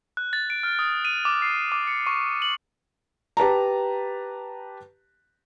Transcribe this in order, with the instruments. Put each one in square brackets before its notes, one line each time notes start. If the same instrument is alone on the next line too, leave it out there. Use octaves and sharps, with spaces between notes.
[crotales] F#6
A6
D7
F6
D#6
D#7
D6
C7
D6
C#7
C#6
F#7
[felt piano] G4 B4 A5 A#5